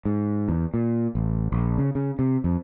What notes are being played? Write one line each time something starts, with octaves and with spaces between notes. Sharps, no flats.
G#2
E2
A#2
A1
A#1
C#3
C#3
C3
F2